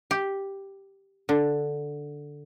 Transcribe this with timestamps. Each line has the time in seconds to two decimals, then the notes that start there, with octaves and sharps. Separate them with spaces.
0.11 G4
1.29 D3